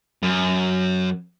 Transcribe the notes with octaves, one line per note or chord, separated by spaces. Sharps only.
F#2